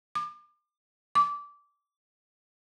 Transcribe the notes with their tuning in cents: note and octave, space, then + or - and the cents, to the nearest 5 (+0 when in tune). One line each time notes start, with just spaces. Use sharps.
D6 +35
D6 -20